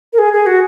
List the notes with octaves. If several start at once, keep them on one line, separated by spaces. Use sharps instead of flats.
A#4
G#4
G#4
F#4